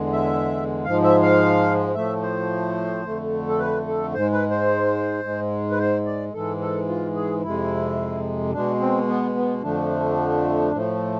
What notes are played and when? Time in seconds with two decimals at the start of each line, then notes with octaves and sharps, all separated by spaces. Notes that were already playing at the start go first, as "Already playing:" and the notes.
Already playing: E2 D3 G#3
0.13 E5
0.85 G#2 F3 G#3 F5
1.04 E5
1.22 F5
1.95 A2 F3 A3 E5
2.22 C5
3.05 F2 D3 A3
3.48 A4
3.59 B4
3.87 A4
4.14 G#2 G#3 C5
4.32 B4
4.50 C5
5.24 G#2 G#3
5.71 B4
5.79 C5
6.06 D5
6.33 G#2 E3 G#3 A4
6.61 A4
6.88 F4
7.15 G#4
7.43 F2 C3 G#3 E4
8.53 B2 G#3 D4
8.80 C4
9.08 B3
9.35 B3
9.62 F2 D3 F3 A3 D4
10.72 A2 F3 A3